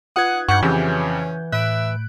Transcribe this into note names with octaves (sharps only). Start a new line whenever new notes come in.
D#4 F4 B4 F#5 D#6 F#6 G#6
G2 F#5 C#6 G6
F2 C#3 E3 C#4 G4 F#5 G6
A2 E5 B5 F#6 D7